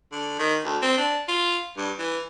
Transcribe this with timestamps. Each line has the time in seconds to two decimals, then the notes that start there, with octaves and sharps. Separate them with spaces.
0.12 D3
0.39 D#3
0.65 D2
0.82 C4
0.97 D4
1.28 F4
1.77 G2
1.99 E3